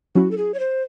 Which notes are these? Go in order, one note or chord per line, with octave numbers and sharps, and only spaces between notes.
F#3 C#4 E4 F#4
A4
G#4
C#5
C5